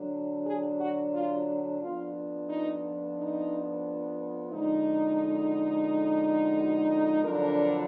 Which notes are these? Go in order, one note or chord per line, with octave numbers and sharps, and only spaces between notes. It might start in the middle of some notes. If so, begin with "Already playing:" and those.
Already playing: D3 F#3 D4
G#4
F#4
F4
F2 F3 B3 D4 F4
D#4
D#4
F2 D3 G#3 D#4
F#4
F2 D3 F#3 D4 A#4